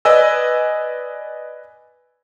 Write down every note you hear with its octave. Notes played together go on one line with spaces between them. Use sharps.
B4 D5 D#5 G#5 E6